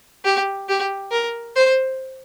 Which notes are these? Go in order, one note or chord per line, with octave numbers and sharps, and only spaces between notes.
G4
G4
A#4
C5